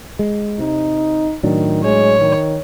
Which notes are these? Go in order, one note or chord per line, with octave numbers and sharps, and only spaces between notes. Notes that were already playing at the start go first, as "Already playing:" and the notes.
G#3
C3 D#4
A2 D#3 F#3 D4
G#3 C#5
D#3